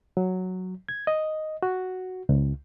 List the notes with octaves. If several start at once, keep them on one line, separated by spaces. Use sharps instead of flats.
F#3
G#6
D#5
F#4
C#2